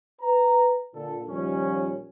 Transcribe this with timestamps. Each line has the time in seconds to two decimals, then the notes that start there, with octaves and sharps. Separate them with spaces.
0.22 B4 A#5
0.95 A#2 D3 A4
1.28 D#2 A#2 F3 G3 C#4